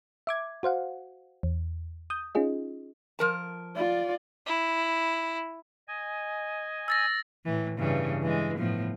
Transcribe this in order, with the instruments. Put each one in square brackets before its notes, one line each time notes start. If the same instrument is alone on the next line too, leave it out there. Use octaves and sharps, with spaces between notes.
[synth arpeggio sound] E5 D6 G#6
F#4 C5 F5 F#5
E2
D#6 G6
C#4 D#4 F4 G#4 D#5
[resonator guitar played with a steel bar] F3 A#4 A5
[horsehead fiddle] F4 D5
[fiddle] E4
[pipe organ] D#5 G#5
[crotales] E6 A6 A#6
[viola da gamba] A2 E3
G2 C#3 E3
E3 G#3
A2 F3 B3